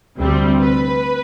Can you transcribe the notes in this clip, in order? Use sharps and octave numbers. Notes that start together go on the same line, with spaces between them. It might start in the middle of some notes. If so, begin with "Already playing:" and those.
D2 C3 G3 C4
B4